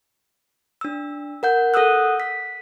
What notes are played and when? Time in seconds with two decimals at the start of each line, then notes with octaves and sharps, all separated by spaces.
0.81 D4 E6
1.43 A#4 F#5 G6
1.74 A4 F#5 D#6 E6 F#6
2.20 B6